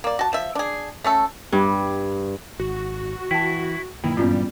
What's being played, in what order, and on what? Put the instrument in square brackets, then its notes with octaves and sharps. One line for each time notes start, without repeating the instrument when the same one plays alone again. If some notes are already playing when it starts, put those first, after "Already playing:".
[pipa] A#3 D5
F#4 A5
F3 E5
D4 G#4
A3 C#4 A4
[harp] G2
[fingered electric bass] G#1 [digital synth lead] F#4
[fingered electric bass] E3 [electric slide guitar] E4 [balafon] G5 A5
[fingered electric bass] F#2 A#2 E3 [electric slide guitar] D#3 [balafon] A#3 [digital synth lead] E4
[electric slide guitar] G2 [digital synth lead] G3 [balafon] B3 C#4 F4